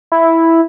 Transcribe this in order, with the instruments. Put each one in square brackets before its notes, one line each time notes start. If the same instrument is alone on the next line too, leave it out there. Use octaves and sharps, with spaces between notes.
[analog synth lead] E4